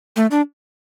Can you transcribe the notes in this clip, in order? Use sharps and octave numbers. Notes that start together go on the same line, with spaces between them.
A3
D4